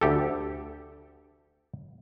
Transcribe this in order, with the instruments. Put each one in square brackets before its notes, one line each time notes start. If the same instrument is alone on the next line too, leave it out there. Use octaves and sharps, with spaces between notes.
[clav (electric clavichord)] D2 G4 A4